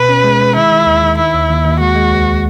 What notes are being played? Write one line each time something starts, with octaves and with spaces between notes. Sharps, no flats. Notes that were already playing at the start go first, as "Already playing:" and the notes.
Already playing: B2 B4
C#4
G#3
G#3
D#3 E4
D#3
D#2
D#3
D#3 E4
D#2
D#2
D#2
G#3 F#4
G#3
C#2